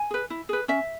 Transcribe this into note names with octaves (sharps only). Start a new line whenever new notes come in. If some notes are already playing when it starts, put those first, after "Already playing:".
Already playing: G#5
G#4 B4
E4
G#4 B4
C#4 E5